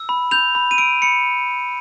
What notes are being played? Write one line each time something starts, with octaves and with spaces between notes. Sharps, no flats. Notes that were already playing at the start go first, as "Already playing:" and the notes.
Already playing: E6
B5
G6 F7
B5
D#7
E6 D7
B5 C#7